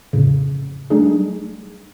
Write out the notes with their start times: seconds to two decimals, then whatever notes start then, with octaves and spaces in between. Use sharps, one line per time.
0.13 F2 A2 C#3
0.90 F#3 G3 A3 D4 D#4 G#4